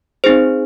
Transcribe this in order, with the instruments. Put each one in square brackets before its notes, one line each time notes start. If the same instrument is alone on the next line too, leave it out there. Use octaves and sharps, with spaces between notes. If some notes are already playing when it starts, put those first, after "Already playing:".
[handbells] C4 D#4 G#4 C5